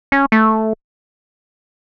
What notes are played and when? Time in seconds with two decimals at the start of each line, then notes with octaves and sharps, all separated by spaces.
0.12 C#4
0.32 A3